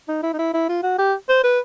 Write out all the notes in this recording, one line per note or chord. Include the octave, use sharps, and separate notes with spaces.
D#4
E4
D#4
E4
E4
F4
F#4
G4
C5
B4